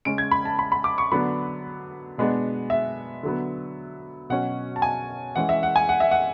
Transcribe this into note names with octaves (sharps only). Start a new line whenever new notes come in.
C#3 G#3 C#4 D7
G#6
B5
A5
B5
B5
D6
C#6
D3 F#3 B3 D4 B5
B2 G#3 B3 D4
E5
D3 F#3 B3
B2 F#3 C#4 F#5
A5
G#5
E3 G#3 C#4 F#5
E5
F#5
G#5
F#5
E5
F#5